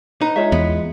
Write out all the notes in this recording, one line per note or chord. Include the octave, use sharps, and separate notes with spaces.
D#4 B4 A#5
G#3 F4 C#5 E5
E2 B3